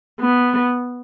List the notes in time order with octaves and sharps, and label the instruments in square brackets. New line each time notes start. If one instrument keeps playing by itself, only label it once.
[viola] B3